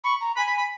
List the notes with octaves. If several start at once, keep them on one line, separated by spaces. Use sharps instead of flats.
B5 C#6
A#5
G#5 B5
B5
B5